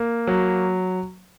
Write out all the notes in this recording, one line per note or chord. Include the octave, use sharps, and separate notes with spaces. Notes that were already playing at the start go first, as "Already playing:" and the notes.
Already playing: A#3
F#3